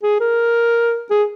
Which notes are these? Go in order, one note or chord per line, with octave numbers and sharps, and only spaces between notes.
G#4
A#4
G#4